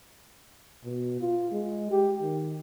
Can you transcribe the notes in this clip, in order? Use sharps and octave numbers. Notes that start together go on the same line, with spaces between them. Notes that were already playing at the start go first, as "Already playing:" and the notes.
B2
F4
G#3
G4
D#3